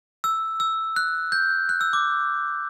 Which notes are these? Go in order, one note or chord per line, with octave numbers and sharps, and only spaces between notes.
E6
E6
F#6
G6
F#6
E6
D6